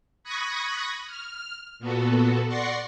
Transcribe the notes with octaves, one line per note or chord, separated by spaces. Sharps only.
B5 C#6 D#6 F#6 G#6 A#6
F6
A#2 B3 F#4 A4
D5 F#5 C6 C#6 A#6 C7